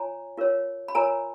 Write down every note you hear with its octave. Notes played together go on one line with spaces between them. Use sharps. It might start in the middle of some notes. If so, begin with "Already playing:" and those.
Already playing: F4 C#5 G#5 A#5
F4 A#4 C#5
B5
F4 A#4 C#5 G#5 A#5